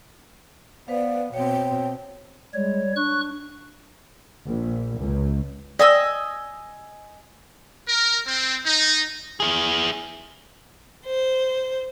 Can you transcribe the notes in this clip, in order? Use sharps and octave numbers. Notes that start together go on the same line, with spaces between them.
B3 B4 C5 D5 F5
B2 C4 C#5 G5
G3 G#3 C#5
D4 C#6 F#6
A#1
C#2
D5 D#5 G#5 E6
A#4
C4
D#4
E4 G#4
C5